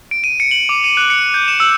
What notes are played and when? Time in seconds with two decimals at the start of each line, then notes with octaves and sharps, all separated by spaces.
0.11 D7
0.24 D#7
0.40 C#7
0.51 F#7
0.69 D6
0.84 D#7
0.97 F#6
1.10 C#7
1.34 G6
1.48 E7
1.60 E6